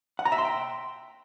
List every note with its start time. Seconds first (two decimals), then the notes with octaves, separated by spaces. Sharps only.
0.19 F#5
0.25 A#5
0.32 E5
0.38 C6
0.45 G5